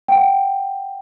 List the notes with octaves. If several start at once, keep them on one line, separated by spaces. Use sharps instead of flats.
F#5 G5